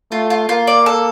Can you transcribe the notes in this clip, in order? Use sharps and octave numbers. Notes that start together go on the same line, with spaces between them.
A3 F4
F4
A#3 F4
D5
A4